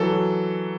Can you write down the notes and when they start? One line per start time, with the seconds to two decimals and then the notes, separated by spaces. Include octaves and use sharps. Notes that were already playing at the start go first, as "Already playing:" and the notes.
Already playing: E3 F#3 A4
0.12 F#3